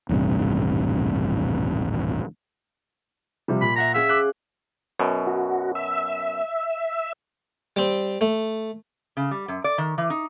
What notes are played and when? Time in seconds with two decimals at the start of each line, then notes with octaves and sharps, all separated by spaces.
0.09 D#1 A1 G2 C3
3.48 C3 F3 G3
3.62 A#2 B5
3.76 E5 F#5 A#5 B6
3.94 C#4 G#4 E5 F5
4.09 D6 F#6
5.00 F#2 B2
5.27 F#4
5.75 E5
7.76 G3 C4
8.21 A3
9.17 C#3
9.31 G3
9.48 F#2
9.64 D5
9.78 D#3
9.98 E3
10.10 D#4